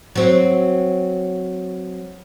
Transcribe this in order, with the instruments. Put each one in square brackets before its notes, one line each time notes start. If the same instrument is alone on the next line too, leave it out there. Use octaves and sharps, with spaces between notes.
[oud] F#3 C4